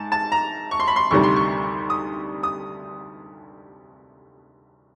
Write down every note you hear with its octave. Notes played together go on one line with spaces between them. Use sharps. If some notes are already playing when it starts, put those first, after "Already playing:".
Already playing: G#2 G#3 A5
A5
A#5
C#6
C6
B5
C6
D2 C3 D#3 G3 C#6
C6
C#6
D#6
D#6